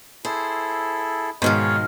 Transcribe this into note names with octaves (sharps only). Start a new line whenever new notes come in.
E4 G#4 A4 C5
G#2 B2 D#3 F3 G#4 C#5 D#5 F6